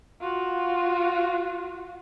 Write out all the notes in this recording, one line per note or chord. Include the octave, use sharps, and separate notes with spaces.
F4 F#4